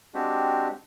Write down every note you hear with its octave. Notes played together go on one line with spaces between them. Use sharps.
G#3 C4 D4 F#4 G4